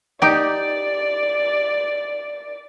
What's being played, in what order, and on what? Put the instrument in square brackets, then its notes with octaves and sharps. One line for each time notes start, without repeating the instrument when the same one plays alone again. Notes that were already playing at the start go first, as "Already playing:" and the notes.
[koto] D#4 G4 [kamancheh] D5